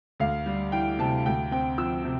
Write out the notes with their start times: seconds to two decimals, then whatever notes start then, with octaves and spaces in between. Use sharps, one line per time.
0.20 D2 F5
0.46 G3
0.72 E3 G5
0.99 C3 A5
1.26 D2 G5
1.51 C4 G5
1.78 F3 E6
2.04 C3